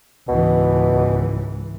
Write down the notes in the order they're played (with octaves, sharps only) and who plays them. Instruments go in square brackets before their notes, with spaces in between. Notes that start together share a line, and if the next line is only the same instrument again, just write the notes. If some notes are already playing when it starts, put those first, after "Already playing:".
[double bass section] C#2 G#2 E3 [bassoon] B2